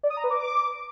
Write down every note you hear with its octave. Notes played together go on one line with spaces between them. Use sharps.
D5
D#6
A#5
B4
D6